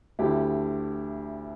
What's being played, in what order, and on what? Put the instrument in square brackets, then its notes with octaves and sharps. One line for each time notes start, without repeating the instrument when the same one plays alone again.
[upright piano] D2 D3 A3 E4 G4